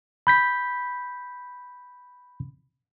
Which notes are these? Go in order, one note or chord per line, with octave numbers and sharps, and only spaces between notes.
B5 G6 B6